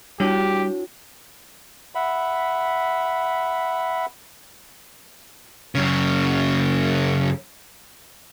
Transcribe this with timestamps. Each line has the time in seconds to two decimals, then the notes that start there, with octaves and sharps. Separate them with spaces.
0.20 G3 D4 E4 F#4 G4 C#5
1.95 E5 F#5 B5
5.75 F#2 C#3